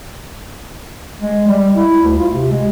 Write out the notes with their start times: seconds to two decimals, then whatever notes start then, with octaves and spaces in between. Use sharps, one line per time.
1.22 G#3
1.48 G3
1.75 E4
2.02 D2
2.18 F4
2.33 C3
2.51 G#3